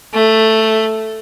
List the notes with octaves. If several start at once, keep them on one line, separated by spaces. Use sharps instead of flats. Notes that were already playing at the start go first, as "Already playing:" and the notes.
A3